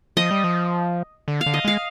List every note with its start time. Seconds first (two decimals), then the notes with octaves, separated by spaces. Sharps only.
0.17 F3 D#5
0.31 G3
0.44 F3
1.28 D3
1.41 F5
1.46 D3
1.54 D#5
1.65 G#3 F5